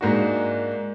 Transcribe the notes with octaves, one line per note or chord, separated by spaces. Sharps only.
G#2 A#3 D4 F#4